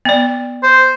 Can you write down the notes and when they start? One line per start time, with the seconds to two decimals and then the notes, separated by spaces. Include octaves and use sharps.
0.05 B3 D5
0.63 C5